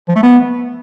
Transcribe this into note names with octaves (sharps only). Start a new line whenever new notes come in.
F3
A3
B3